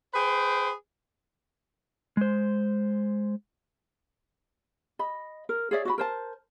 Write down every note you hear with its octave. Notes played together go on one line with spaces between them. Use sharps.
G#4 B4 C5 G5
G#3 C5
D#5 B5
A#4
G#4 C#5 D5 E5
F#4 E5 B5
A#4 C5 A5